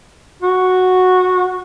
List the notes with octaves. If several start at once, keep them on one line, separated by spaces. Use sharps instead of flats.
F#4